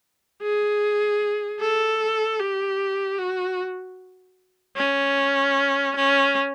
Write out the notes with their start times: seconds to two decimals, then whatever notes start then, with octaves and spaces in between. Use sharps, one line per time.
0.42 G#4
1.61 A4
2.39 G4
3.18 F#4
4.77 C#4
5.96 C#4